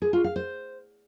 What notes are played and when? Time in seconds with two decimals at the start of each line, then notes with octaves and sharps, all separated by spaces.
0.02 G#4
0.13 F4
0.24 F5
0.36 C5